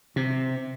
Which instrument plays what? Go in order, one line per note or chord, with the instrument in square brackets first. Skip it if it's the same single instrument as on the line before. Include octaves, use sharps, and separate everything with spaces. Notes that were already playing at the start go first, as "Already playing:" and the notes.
[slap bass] C3